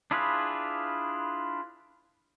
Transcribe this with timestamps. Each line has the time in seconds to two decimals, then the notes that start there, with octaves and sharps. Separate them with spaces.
0.11 D4 E4 F4 G#4 B4